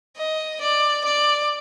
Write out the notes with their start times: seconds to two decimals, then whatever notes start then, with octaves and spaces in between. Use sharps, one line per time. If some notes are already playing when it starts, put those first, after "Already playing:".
0.17 D#5
0.61 D5
1.05 D5